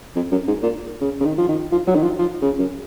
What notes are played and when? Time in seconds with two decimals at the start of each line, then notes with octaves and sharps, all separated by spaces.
0.16 F2
0.32 F#2
0.47 G#2
0.62 A#2
1.01 C#3
1.20 C#3
1.25 D#3
1.38 F3
1.48 D#3
1.72 F3
1.87 F#3
1.96 D#3
2.03 F3
2.19 F3
2.42 C#3
2.58 F#2